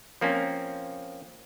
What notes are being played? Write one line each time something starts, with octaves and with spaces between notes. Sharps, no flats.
F3 A#3 C4 C#4